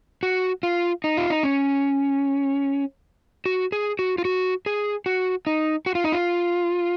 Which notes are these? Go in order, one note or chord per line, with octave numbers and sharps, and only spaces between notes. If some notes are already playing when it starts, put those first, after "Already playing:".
F#4
F4
D#4
F4
D#4
C#4
F#4
G#4
F#4
F4
F#4
G#4
F#4
D#4
F#4
F4
D#4
F4